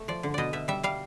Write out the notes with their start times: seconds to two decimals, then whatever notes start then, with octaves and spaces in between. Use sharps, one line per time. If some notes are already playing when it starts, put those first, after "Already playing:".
Already playing: A3
0.08 F3 D5
0.23 D3
0.34 B2 D5 D#5
0.53 B2 E5
0.68 G3 E5
0.83 G3 F5